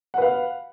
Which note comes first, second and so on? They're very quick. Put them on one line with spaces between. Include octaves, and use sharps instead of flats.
F#5 B4 F5